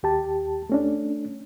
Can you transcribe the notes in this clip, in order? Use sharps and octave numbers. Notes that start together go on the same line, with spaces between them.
D#2 G4 A5
A3 C#4 D4